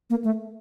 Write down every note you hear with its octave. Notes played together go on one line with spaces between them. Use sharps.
A#3
A3